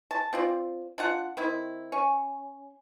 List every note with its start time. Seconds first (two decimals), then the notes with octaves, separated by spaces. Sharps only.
0.11 A5
0.33 C4 F4 D5
0.98 D4 F4 F#5
1.37 D#3 C4 E4
1.92 C#4